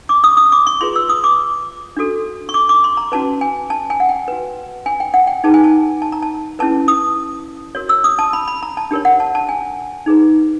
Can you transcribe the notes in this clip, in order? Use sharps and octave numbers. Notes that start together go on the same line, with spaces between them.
D6
D#6
D#6
D6
C#6
F4 G#4 B4 C6
E6
D#6
D6
D4 F#4 A4
C#6
D6
D6
C6
A#5
C#4 F#4 B4 A5
G#5
A5
G#5
F#5
G5
F#4 B4
G#5
G5
F#5
G5
D#4 G#4 B4 A5
G#5
A5
A5
A#5
A5
C#4 E4 G#4 B4 A5
D#6
F#4 A#4 C#5
E6
D#6
A5
B5
B5
A#5
A5
D4 G4 A#4 C#5
F#5
A5
A5
G#5
D#4 G#4 B4